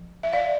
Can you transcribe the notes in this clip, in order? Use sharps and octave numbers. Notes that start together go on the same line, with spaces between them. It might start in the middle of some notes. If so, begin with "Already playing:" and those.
Already playing: F3
E5
D5 F5